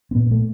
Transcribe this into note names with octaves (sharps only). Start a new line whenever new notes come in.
C4
A#2 B3
A3